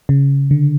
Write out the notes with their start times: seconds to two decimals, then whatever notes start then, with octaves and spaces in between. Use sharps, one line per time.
0.09 C#3
0.51 D3